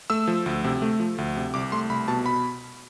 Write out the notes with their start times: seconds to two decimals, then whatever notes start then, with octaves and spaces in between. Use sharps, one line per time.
0.10 A3 E6
0.27 F3
0.46 D2
0.64 C3
0.82 A3
1.00 F3
1.18 D2
1.37 C3
1.54 C2 D6
1.72 A3 C6
1.90 C2 B5
2.08 B2 A5
2.26 B5